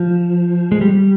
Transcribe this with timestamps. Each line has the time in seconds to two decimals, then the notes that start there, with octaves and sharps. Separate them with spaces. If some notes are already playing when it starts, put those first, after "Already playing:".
Already playing: F3
0.72 G#3
0.81 G3